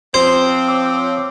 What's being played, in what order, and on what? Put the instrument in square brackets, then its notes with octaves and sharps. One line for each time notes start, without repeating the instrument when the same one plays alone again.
[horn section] F3 C4 [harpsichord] C5
[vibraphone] C#5 D6 E6